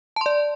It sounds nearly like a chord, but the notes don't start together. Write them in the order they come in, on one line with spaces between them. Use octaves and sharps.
A5 C6 D5